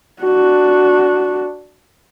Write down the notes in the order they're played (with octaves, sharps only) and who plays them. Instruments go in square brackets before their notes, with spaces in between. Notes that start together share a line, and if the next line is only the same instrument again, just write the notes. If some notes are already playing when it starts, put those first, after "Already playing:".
[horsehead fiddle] D4 F#4